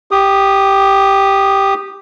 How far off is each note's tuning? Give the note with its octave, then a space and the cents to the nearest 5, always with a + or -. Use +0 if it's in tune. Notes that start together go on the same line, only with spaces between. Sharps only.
G4 +0 D#6 -20